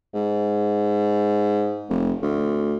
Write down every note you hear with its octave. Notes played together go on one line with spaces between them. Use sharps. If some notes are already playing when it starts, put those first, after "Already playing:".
G#2
F1
D2